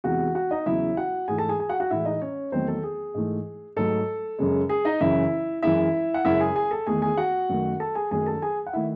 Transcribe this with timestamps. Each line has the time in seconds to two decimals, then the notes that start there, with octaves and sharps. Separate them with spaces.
0.04 E2 C3 E3 G#3 F#4 F#5
0.35 F#4 F#5
0.51 D#4 D#5
0.66 E2 C#3 F#3 E4 E5
0.97 F#4 F#5
1.28 G#2 E3 A3 G#4 G#5
1.38 A4 A5
1.49 G#4 G#5
1.59 G#4 G#5
1.69 F#4 F#5
1.80 F#4 F#5
1.91 A2 E3 G#3 E4 E5
2.05 D#4 D#5
2.22 C#4 C#5
2.52 E2 D#3 F#3 A3 C4 C5
2.68 A4
2.83 G#4
3.14 G#2 E3 A3
3.76 G#2 F#3 A3 A4
4.39 F#2 C#3 G#3
4.69 G#4
4.85 D#4 D#5
5.01 F#2 C#3 E3 E4 E5
5.63 F#2 E3 G#3 E4 E5
6.14 F#5
6.25 F#2 C#3 G#3 E4 E5
6.40 G#4 G#5
6.56 G#4 G#5
6.71 A4 A5
6.87 E2 D#3 A3 G#4 G#5
7.02 G#4 G#5
7.17 F#4 F#5
7.49 F#2 D#3 A3
7.80 A4 A5
7.95 G#4 G#5
8.11 F#2 D#3 F#3 A3 G#4 G#5
8.26 A4 A5
8.42 G#4 G#5
8.66 F#5
8.73 D#3 A3 E4 E5